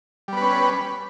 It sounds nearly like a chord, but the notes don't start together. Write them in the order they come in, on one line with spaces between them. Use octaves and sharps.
G3 B3 B4 C#4